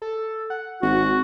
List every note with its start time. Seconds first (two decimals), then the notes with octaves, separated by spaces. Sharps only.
0.02 A4
0.50 F#5
0.82 G#1 F#4